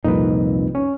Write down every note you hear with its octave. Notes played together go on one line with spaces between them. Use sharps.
C2 F2 A#2 D#4 B4
C#4